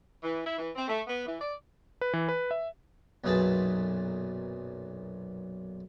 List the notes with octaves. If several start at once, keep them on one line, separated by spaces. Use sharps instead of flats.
E3
E4
E3
C4
A3
B3
E3
D5
B4
E3
B4
E5
B1 F#2 A#2 G#4 B4 A5